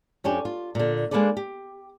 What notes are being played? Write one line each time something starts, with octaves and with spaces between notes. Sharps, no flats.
F2 C#4 D4 G4
F4
A#2 D3
G#3 A#3 D4 A4 B4 D5
G4